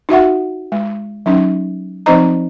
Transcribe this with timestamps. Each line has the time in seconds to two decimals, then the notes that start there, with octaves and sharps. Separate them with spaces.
0.09 D#4 F#4 E5 F#5
0.72 G#3
1.26 F#3 C#4 D#4
2.06 F3 C4 D#4 C5 D#5 A#5